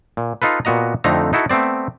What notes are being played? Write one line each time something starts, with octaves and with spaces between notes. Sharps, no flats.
A#2
D#4 F4 A4 B4
A#2 B3 F#4 D#5 A#5
F2 D3 A3 C4 D#4 A#5
D#4 E4 F#4 A4
A3 B3 C4 D5